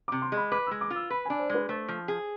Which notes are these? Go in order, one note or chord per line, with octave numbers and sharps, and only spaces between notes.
C3 D6
C6
G#3 B5
B4 D6
G#3 E6
D6
F4 E6
B4 B5
D4 G#5
C5
G#3 B4
A3 C5
F3
G#4